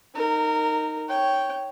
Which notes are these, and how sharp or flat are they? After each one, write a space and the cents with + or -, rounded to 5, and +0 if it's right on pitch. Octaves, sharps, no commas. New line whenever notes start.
D#4 +0 A#4 -20
C#5 +0 G5 -10